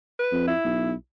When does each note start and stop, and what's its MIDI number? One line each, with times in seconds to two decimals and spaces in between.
0.19 0.46 71
0.32 0.53 41
0.47 0.92 64
0.64 0.94 35